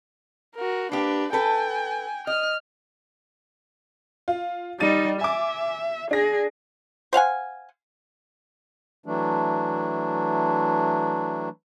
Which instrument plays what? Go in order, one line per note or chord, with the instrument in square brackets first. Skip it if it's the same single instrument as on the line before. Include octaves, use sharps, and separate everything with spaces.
[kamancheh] F#4 A#4
[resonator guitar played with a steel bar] A#3 G4 [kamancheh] D4 B4
[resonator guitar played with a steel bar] A4 B4 [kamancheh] G5 G#5
[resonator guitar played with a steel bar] D#5 [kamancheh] F6
[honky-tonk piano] F4
[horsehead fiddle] G3 D#4 [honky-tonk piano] A6 D#7
[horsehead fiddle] E5 [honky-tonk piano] G#5 D6
[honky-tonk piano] D4 A#6 [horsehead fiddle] G#4
[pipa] C5 F5 F#5 G#5
[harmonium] E3 F#3 A3 D4